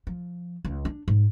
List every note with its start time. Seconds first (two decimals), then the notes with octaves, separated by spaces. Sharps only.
0.07 F3
0.65 C#2
0.85 D4
1.08 G#2